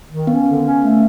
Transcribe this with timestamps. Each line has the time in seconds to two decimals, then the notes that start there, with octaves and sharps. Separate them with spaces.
0.10 D#3
0.27 B3 C#4
0.45 D3
0.63 C#4
0.82 A3